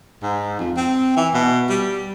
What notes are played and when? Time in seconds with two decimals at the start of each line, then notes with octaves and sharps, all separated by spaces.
0.23 G#2
0.59 F2
0.77 C4
1.16 E3
1.34 B2
1.70 G3